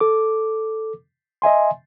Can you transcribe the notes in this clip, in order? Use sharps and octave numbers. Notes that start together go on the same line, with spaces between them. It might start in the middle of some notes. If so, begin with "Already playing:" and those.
A4 D6
D#5 E5 G#5 C6